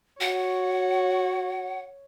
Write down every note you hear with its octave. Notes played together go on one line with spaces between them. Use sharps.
F#4 C#5 F#5